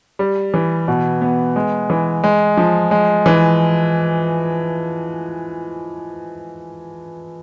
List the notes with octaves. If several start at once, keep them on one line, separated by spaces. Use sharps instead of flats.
G3
E3
B2
B3
G#3
E3
G#3
F3
G#3
E3